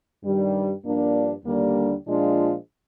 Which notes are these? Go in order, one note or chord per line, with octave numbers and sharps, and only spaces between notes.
G2 D#3 G3
G2 F3 A#3 D4
D#2 D3 G3 A#3 D4
A#2 F3 G#3 D4 F4